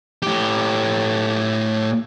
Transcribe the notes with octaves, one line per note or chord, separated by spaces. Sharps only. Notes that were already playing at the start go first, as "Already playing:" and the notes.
A2 G4